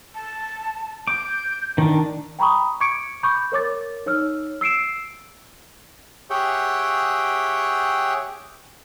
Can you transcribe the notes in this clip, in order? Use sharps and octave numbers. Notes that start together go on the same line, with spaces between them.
A5
D6 G6
D#3 D4
G5 A#5 B5 C#6 D#6
C#6 D6 G#6 C#7 D7
B5 C#6 D6 G6
A#4 C#5 D6 A6
D#4 C#5 E6 F6
E6 C7 D7 E7
G4 G#4 C#5 E5 F#5 G5